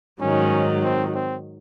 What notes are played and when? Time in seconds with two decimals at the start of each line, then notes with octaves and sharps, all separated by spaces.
0.21 G#2 D#3 F#3 C#4
0.83 C4
1.15 C4